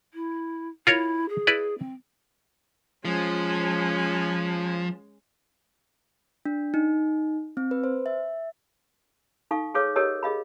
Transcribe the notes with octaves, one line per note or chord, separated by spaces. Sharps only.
E4
E4 F4 A#4 C#5
G#4
E4 B4 D5
C4
F3 G#3 C#4
D4
D#4
C4
B4
C5
E5
D#4 A4 F5 C#6
G#4 A4 B4 C#5 F5 D6
G4 A4 A#4 C#5 D#5
G#4 D#5 F5 B5